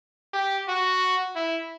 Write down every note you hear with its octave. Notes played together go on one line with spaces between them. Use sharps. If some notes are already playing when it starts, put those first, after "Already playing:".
G4
F#4
E4